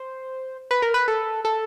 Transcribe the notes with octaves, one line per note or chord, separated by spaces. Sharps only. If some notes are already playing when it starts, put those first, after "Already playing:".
Already playing: C5
B4
A#4
B4
A4
A4